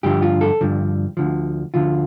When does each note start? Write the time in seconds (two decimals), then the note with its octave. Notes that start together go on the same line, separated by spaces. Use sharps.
0.03 G2 D3 F3 G4
0.22 F4
0.41 A4
0.61 G2 D3 F3
1.17 D2 D3 F3
1.74 D2 D3 F3 F4